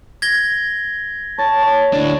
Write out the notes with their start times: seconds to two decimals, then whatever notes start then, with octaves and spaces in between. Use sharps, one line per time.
0.22 G#6 A#6 G7
1.38 C#5 A5
1.63 C#5
1.93 D2 D4 E4